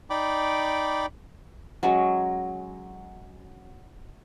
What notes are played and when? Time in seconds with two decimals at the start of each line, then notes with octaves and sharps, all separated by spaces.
0.10 D#4 D5 G5 B5 D6
1.83 F#3 G#3 C#4